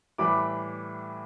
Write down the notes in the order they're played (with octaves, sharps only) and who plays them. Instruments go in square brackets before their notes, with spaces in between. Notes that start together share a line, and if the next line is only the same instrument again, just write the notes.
[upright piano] A2 E3 G3 B5 D6